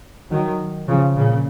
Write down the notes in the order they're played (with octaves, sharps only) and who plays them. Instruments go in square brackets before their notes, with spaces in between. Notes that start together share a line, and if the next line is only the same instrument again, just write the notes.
[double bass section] D#3 F#3
C#3 F3
A#2 C#3